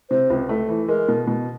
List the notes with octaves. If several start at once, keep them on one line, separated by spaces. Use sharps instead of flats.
C3 C5
C#2
A3
E3
G#3 A#4
B2
B2